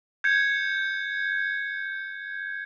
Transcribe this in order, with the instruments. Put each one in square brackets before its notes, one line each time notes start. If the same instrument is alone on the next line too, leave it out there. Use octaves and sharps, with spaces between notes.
[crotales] G6 G#6 C#7